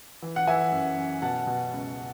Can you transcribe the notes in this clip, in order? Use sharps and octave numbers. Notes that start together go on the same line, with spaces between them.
E3
F#5
E3 E5 G#5
F#2
F#2
B2 F#5 A5
B2
C#2